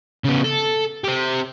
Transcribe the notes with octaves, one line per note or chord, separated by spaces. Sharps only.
C#3 B3
A4
C4 G4